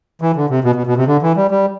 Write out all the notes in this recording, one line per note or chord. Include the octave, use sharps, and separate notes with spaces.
E3
D3
C3
B2
B2
B2
C3
D3
E3
G3
G3